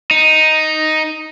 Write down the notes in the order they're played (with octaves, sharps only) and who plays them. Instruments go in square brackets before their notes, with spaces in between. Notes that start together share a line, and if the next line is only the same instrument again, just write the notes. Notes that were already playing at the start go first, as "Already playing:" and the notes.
[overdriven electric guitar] D#4